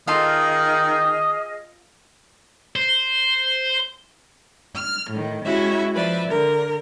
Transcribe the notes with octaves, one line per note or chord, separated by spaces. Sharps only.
D#3 F4 G#4 A4 D#5 F5 D#6 F6
C5
F6
A2 D#3
G#3 C#4 E4 F#4 G4 E5
F3 B4 D5 E5
D3 A#4